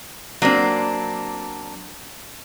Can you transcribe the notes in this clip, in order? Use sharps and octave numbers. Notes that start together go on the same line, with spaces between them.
F#3 A#3 C4 D4